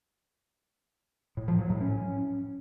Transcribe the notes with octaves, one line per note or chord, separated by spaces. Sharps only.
A2
F3
F#3
A2
C#4